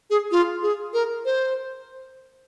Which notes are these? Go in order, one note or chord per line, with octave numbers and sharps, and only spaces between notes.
G#4
F4
G#4
A#4
C5